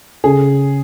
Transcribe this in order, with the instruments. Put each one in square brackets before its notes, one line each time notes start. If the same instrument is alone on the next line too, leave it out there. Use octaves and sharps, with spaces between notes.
[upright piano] C#3 [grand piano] G#4